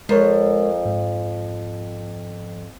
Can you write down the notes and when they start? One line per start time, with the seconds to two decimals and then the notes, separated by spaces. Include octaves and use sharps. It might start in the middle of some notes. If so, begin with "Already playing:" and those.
0.09 F2 G#3 A#4 C#5
0.85 G#2